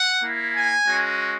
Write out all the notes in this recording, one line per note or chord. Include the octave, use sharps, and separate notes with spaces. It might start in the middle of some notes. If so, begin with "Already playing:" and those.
Already playing: F#5
A#3 E4
G#5
G#3 C#4 F#4